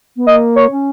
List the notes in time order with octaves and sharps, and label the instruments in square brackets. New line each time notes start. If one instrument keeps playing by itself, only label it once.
[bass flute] B3
[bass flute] A#3 [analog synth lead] D#5
[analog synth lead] C#5
[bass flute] C#4